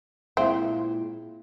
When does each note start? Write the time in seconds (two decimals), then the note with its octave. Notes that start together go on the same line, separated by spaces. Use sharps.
0.37 A#2 G#3 C4 E4 E5 F5